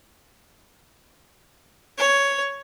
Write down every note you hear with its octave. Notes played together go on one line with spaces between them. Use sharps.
C#5